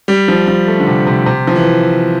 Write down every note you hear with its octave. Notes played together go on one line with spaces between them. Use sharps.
G3
F3
F3
A3
D3
C3
C3
C3
F3
E3